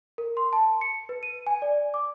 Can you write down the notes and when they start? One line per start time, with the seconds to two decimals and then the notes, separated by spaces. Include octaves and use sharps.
0.18 A#4
0.37 C6
0.53 A5
0.81 C#7
1.09 B4
1.23 D#7
1.47 G#5
1.62 D5
1.94 D6